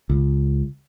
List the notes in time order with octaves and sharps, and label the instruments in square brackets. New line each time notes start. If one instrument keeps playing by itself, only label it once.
[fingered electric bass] C#2